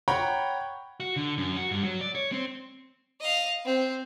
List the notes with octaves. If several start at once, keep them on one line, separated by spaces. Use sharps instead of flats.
C#5 F#5 G5 A#5 B5 C#6
F#4
D3
F#2
F#4
G2
F#3
D5
C#5
C4
D#5 F5
C4